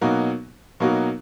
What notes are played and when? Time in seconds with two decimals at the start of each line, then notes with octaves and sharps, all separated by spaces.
0.01 B2 F#3 A#3 D#4 F#4
0.80 B2 F#3 A#3 D#4 F#4